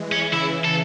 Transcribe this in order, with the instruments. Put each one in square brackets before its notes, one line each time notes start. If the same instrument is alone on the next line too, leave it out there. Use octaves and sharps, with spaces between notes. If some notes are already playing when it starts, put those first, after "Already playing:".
Already playing: [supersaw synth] E3 G#3
[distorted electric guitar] C#4
[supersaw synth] C#3 E3 [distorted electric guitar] E4
[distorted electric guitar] A4